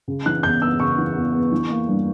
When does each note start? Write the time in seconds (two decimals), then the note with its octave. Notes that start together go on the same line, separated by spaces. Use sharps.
0.08 C#3
0.26 E3 F#6
0.43 E2 G6
0.62 B3 E6
0.80 C#3 C#6
0.98 E3
1.16 E2
1.34 B3
1.52 E3
1.70 A#3
1.88 G2